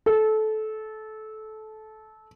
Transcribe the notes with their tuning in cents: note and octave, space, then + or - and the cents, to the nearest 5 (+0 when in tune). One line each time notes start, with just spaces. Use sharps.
A4 -20